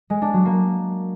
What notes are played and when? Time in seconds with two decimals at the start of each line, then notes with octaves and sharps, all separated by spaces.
0.10 G#3
0.22 D4
0.33 F#3
0.45 A#3